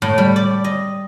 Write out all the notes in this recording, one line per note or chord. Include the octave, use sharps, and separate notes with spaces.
A2
G3
D5
D#5